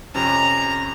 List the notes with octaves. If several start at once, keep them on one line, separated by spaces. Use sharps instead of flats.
F2 C3 C#4 A#5